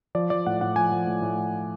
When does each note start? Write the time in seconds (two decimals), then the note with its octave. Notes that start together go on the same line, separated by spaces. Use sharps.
0.15 F3 D5
0.30 F3 D5
0.46 A2 F#5
0.61 A2 F#5
0.76 F3 G#5
0.92 F3
1.07 A2
1.22 A2